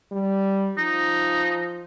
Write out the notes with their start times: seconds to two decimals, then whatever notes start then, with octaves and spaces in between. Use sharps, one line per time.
0.12 G3
0.77 F3 D#4